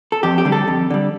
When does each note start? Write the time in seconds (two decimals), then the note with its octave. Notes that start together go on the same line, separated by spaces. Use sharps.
0.12 A4
0.23 F2 G4
0.38 G4
0.45 D3 G3
0.52 A4
0.68 F2
0.90 D3 G3